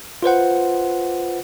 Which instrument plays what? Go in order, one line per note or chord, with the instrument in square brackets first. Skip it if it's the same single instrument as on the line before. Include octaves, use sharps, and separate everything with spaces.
[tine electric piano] F4 B4 C5 F#5